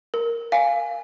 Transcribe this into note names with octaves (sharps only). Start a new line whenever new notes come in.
A#4
F5 G#5